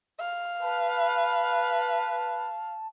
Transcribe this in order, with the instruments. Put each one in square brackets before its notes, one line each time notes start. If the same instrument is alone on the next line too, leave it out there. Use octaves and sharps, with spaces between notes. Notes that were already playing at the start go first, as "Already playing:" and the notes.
[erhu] F5
[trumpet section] B4 [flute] A5